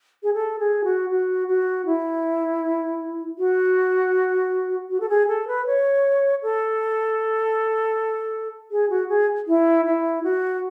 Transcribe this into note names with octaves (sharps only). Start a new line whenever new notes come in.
G#4
A4
G#4
F#4
F#4
F#4
E4
F#4
F#4
A4
G#4
A4
B4
C#5
A4
G#4
F#4
G#4
E4
E4
F#4